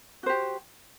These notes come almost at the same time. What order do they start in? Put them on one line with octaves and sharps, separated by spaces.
F#4 C5 G4